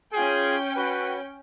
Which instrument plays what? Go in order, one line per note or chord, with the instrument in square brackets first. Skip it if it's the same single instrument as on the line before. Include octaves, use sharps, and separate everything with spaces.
[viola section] C#4 G5 [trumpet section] F4 G#4 G#5
[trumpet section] F#4 B4